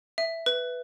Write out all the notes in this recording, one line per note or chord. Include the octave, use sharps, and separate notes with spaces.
E5
B4